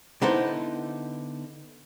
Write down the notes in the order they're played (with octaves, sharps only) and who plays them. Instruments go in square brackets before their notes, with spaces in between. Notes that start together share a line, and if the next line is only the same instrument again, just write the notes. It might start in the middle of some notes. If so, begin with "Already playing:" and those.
[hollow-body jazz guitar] D3 B3 D#4 E4 C5